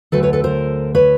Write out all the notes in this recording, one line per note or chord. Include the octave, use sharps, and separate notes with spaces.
D2 D3 F#3 A3 A4 B4
B4 C#5
A4 B4
A#4 C5
B4 C#5